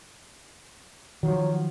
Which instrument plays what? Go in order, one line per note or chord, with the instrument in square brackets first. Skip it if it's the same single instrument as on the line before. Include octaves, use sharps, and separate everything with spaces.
[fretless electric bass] D#3 F3 [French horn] F#3